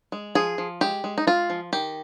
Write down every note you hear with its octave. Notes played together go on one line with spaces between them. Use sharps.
G#3
F3 G#4
F3
G#3 G4
G#3
D#4
G#3 F4
F3
D#3 G4